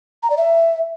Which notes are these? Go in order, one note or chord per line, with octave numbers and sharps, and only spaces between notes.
A#5
D5
E5